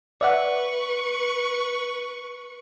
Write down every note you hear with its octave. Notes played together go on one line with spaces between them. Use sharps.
B4 D5 E5 F#5 C#6